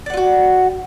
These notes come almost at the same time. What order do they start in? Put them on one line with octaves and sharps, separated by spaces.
D5 F#5 F4 F#4